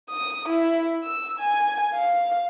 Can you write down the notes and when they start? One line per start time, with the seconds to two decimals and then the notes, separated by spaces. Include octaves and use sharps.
0.11 D#6
0.49 E4
1.03 E6
1.39 G#5
1.94 F5